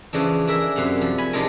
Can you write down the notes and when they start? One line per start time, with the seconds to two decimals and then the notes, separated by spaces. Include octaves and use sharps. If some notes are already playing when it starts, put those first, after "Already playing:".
0.13 C#3 E3 F3 D4
0.47 D4 G#4 A#4 E5
0.76 F#2 C3 F5 F#5
1.01 F3
1.18 G#5 B5
1.33 C3 G#3 D4 D#4 F4 A#4